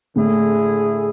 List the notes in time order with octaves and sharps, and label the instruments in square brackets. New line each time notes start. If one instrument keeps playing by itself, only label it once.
[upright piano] A2 [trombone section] D3 A3 E4 G#4